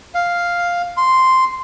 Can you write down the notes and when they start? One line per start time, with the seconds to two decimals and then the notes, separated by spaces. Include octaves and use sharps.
0.14 F5
0.97 C6